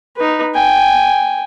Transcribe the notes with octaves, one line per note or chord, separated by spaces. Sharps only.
D#4 B4
G5 G#5